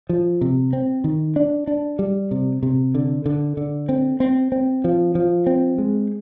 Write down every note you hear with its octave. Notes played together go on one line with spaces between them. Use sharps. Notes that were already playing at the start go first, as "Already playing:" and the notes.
F3
C3
C4
D#3
D4
D4
G3
C3
C3
D3
D3
D3
C4
C4
C4
F3
F3
C4
G#3